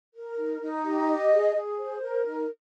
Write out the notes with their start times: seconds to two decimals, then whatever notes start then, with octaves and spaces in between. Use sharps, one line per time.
0.15 A#4
0.38 D#4
0.61 D#4
0.84 G4
1.08 D#5
1.31 G#4
1.55 G#4
1.79 C5
2.02 A#4
2.26 D#4